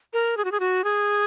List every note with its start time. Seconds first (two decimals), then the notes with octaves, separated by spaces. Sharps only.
0.13 A#4
0.37 G#4
0.45 F#4
0.52 G#4
0.60 F#4
0.84 G#4